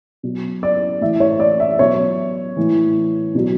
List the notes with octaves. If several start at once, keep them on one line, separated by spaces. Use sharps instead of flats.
B2 F#3
D5
A2 E3 E5
C#5
D5
E5
B2 F#3 C#5
A2 E3
B2 F#3